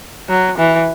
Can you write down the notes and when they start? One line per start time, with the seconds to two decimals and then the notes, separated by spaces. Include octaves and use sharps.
0.29 F#3
0.58 E3